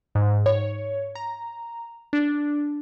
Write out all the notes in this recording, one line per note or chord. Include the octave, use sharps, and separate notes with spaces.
G#2
C#5
A#5
D4